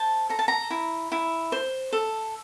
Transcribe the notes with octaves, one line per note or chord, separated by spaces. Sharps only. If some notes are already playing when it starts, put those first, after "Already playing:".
Already playing: C5 A5
A4 A#5
A5
A#5
E4
E4
C5
A4